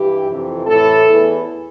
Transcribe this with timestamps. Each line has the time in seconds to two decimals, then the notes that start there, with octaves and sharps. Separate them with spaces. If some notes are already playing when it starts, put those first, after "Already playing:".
Already playing: G2 E3 G4
0.28 F2 C3 E3
0.66 A2 E3 A4
1.05 E2 E3